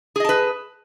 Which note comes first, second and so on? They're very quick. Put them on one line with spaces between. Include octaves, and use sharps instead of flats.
G#4 D#5 A5 B4